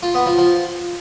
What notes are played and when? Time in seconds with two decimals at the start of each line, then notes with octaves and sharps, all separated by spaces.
0.03 F4
0.14 B3
0.26 F3
0.38 F3